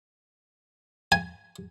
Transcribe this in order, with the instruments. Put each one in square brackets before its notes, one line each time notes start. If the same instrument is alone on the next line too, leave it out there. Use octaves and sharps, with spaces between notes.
[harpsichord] G#5